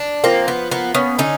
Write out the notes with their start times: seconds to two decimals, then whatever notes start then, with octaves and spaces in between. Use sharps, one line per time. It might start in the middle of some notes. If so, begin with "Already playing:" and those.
Already playing: D4
0.24 F3 A#3 C4
0.48 B3
0.72 A#3 B3
0.95 B3 C#4
1.18 D3 C#4 D#4